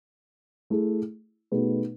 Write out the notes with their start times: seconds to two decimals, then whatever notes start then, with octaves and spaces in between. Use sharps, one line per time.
0.70 A3 E4 G#4
1.51 B2 A3 D#4 G#4 B4